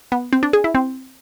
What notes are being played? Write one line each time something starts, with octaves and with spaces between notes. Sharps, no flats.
B3
C4
D4
G#4
E4
C4